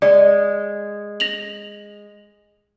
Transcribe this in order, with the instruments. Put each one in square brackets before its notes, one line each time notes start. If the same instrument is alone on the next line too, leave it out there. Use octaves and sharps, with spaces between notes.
[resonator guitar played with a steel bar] G#3 [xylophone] D5
[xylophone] A#6 F7 F#7